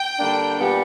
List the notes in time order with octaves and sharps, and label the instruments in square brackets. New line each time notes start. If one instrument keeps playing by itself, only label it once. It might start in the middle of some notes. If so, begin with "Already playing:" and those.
Already playing: [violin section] G5
[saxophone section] D3 G3 A#3 D4
A#2 G3 B3 D4 G4